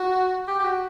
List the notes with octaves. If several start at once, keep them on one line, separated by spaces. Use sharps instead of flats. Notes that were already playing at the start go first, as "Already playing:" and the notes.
Already playing: F#4
G4
G4
F#4